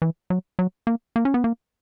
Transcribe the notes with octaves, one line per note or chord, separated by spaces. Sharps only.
E3
F#3
F#3
A#3
A#3
C#4
B3
A#3